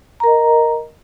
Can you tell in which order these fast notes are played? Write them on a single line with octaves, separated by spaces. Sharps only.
A#5 A#4 D#5